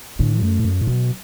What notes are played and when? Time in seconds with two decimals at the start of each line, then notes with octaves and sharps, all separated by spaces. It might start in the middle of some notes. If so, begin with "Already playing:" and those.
0.19 A2 D3
0.42 F#2 A3
0.60 A2
0.65 F#2
0.81 A2
0.87 B2 F#3